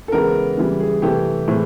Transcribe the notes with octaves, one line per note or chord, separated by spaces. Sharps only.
A4
C#3 E3 G#3 B3 A#4
C#3 E3 G3
G#4
C3 E3 A3 G4
A2 E3 G#3 C4